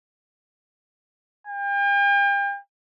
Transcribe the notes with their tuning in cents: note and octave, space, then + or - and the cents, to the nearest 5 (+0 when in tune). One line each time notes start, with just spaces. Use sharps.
G5 +40